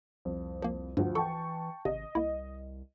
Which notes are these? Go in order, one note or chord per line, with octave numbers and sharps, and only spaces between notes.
C2 F2
F3 A#3
D2 G2 F3
E3 A4 G5 A5 C#6
G#1 C3 D#5
C2 A#3 E4